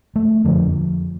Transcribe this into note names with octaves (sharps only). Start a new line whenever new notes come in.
A3
F2 D3 F3